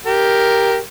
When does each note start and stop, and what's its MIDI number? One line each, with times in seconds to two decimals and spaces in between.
0.06 0.78 67
0.06 0.78 70